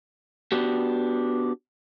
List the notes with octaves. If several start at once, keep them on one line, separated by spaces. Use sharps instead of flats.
B3 D4 F#4 G4